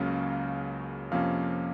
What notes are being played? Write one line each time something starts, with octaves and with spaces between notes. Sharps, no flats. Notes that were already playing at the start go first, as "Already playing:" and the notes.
Already playing: C#2 C#3 F#3 A#3 C#4 F5
F2 C3 F3 A#3 C#4 F5